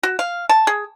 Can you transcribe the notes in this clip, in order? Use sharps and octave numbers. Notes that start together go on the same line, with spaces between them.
F#4
F5
A5
G#4